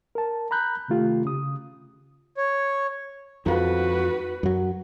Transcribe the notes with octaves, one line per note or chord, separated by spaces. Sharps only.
A#4 A5
A#5 B5 F#6 G6
C3 D#3 A3 F4 G4
C#3 D#6
C#5
F2 F3 F#4 B4
F#2 F#3